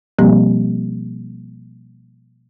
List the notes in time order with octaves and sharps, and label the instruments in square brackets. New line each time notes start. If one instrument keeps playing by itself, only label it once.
[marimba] B2 F3 G3 A#3 C4 G4